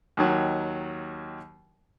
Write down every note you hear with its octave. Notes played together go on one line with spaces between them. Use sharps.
D#2 D#3 F#3